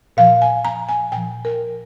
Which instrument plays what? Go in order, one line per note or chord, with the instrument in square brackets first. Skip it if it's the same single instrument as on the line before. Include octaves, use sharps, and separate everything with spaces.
[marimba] A#2 F3 F5
G#5
A#5
G#5
A#2 F3 G5
A#4